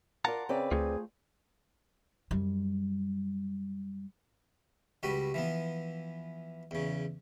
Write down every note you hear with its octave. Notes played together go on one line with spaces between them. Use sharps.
F4 A#4 D5 F#5 A5 A#5
C#3 C4 B4 D5
D2 A3 F4 G#4
F#2 G3
C#2 G3 F#4 B4
E3 F3 B3
E2 C#3